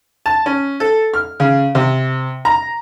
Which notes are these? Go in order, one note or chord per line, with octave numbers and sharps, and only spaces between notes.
A5
C#4
A4
F6
C#3
C3
A#5